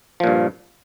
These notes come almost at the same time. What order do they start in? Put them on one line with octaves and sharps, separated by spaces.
F3 A#2 G2